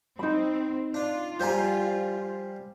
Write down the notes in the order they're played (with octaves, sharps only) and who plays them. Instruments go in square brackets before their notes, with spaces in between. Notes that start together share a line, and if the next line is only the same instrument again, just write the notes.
[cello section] C4 [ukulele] D#4 B5
[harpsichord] D4 [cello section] F4
[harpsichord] F3 G3 G#5 [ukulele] C5 A#5